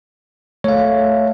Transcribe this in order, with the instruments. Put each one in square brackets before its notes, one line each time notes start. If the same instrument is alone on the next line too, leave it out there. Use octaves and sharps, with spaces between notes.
[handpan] A3 [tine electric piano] C#5 F5